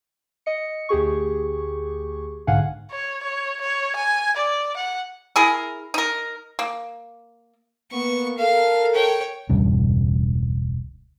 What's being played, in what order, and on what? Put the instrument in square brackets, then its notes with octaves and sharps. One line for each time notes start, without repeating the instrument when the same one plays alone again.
[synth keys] D#5 C#7
D2 G4 G#4 C#6
B1 G#2 D3 F5 F#5 G#5
[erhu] C#5
C#5
C#5
G#5
D5
F#5
[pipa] E4 G#4 A#4
D#4 A#4
A#3
[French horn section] A#3 B3 [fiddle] C#6
[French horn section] A4 A#4 [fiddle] F5
[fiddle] C#5 G5
[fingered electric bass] E1 C#2 G2 C#3